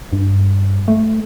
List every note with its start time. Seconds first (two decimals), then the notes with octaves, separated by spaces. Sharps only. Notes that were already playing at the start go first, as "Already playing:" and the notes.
0.13 G2
0.88 A3